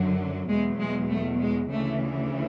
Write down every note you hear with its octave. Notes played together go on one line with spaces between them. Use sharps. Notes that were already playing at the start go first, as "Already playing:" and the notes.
Already playing: F#2 D3 F#3
E2 B2 F#3 G#3
G#3
A3
G#3
D2 C#3 E3 A3